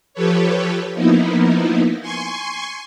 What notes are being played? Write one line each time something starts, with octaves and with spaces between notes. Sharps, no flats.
F3 G4 A4 B4 C#5
F3 A#3 B3 D#4 E4
G#5 C6 C#6